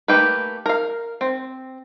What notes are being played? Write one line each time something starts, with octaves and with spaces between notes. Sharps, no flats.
A3 A#3 G4 B4
A#4 F5
C4